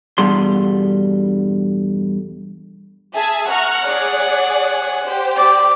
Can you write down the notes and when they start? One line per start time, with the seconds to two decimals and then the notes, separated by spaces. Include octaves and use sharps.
0.18 E2 G2 B2 D3 G3 C6
3.14 G#4 E5 A5
3.48 F#5 A#5 C#6 F6
3.85 G#4 C#5 D5
5.04 G4 C5
5.37 D5